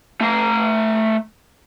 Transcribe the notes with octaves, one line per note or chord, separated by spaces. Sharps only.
A3 A#5